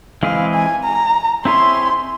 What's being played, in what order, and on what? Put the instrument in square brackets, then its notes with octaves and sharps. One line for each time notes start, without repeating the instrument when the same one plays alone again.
[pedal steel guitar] E3 G#3 C4 E4 G#4 [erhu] F5
[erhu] G#5
A#5
[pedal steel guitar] C4 E4 G#4 C#5 E5 [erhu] C6